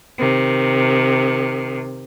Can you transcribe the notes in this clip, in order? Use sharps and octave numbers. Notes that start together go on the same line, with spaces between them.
C3 D#3